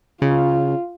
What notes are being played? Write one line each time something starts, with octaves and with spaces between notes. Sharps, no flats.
C#3 F4